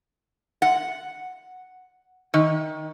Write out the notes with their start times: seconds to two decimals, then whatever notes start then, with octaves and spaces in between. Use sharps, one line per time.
0.62 F#5
2.34 D#3